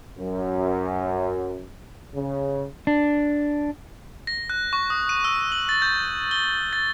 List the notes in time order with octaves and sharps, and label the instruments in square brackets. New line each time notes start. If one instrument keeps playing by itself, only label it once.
[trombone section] F#2
C#3
[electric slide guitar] D4
[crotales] A#6
F#6
C#6
D#6
D#7
E6
F#7
A6
G6
G7
A6